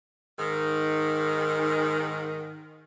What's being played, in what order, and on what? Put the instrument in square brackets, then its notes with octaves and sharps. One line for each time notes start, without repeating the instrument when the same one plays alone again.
[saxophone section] G#2 D#3